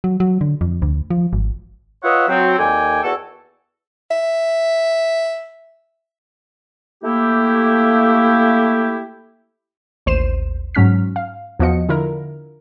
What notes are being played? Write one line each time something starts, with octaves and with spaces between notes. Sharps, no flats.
F#3
F#3
D3
F2
D2
F3
G#1
F4 B4 C#5 D#5 E5 F#5
F#3 C4
D#2 A4 D5 G5 G#5
E2 F#4 A4
E5
A3 A#3 E4 G4
A1 D#2 C5 C7 D#7 E7
G#2 F#3 C#4 F6 B6
F5
E2 F3 B3 F#4 D#5 C#7
D3 E4 F4 A#4